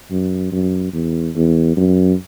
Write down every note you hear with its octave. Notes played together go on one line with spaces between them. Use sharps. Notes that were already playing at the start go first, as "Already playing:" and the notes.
F#2
F#2
E2
E2
F#2